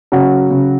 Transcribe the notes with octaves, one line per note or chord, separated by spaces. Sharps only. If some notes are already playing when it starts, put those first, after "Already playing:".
C#3 F#3 F#4
C#3